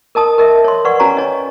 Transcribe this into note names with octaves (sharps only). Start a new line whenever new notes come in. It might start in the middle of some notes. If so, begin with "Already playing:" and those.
A#4 D#5 A5 D#6
A#4 D#5 E5
C#5 C6
B4 D5 F#5 C#6
C#4 F#4 C#5 G#5 A#5 C#6
C#5 D#5